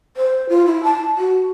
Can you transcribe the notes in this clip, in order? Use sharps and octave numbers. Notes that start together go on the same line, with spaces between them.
C5
F4
E4
A5
F#4